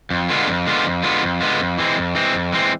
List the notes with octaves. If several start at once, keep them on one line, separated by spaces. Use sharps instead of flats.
F2
D3 G#3 B3 F4
F2
D3 G#3 B3 F4
F2
D3 G#3 B3 F4
F2
D3 G#3 B3 F4
F2
E3 G#3 C4
F2
E3 G#3 C4
F2
E3 G#3 C4